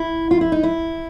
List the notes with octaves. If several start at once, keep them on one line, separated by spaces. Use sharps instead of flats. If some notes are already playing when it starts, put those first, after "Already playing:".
Already playing: E4
F4
E4
D#4
E4